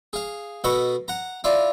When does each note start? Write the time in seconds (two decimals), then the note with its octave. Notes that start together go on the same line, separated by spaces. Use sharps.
0.13 G#4 F5
0.64 B2 A4 D#5 F#5 B5 C#6
1.08 F#5 A#5
1.44 E4 F4 D5 F5